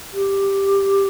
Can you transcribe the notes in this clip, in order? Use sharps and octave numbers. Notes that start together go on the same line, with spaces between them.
G4